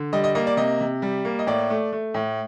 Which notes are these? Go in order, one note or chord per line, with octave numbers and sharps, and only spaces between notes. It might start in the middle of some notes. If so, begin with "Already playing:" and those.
Already playing: D3
G3 D#5
D#5
A#3 D#5
D5
C3 D#5
C3
G3
A#3
D#5
A2 D5
A3
A3
A2